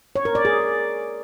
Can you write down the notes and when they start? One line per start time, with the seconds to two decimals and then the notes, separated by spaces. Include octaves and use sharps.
0.16 C#5
0.25 A#4
0.35 D5
0.45 G#4